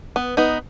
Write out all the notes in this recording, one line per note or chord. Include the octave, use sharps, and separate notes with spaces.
B3
B3 D#4